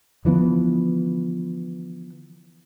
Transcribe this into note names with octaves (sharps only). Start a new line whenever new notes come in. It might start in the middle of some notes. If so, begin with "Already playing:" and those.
D3 E3 F3 B3